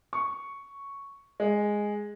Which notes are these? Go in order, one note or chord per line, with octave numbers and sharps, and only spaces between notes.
C#6
G#3